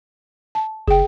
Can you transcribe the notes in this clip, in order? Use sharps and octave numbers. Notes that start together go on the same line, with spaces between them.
A5
F#1 G#4 G5